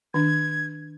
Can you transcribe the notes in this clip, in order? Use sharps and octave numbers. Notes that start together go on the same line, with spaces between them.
D#3 D4 G#6